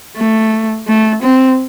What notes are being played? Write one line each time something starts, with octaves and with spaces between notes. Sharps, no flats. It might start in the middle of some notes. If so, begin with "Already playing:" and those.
A3
A3
C4